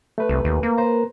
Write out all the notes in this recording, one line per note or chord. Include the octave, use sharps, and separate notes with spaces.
A3 B4
C2
D#2
A#3
B4 C5 A#5